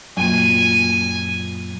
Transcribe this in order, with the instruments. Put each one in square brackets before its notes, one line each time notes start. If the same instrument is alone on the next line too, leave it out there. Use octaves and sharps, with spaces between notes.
[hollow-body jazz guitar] F#2 A#2 [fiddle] G#5